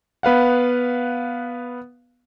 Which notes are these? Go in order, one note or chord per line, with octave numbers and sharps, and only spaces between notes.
B3 B4 F5 F#5